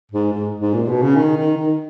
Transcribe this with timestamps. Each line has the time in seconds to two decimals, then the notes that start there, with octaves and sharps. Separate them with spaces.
0.12 G#2
0.33 G#2
0.60 G#2
0.74 A#2
0.88 B2
1.02 C#3
1.16 D#3
1.37 D#3
1.56 D#3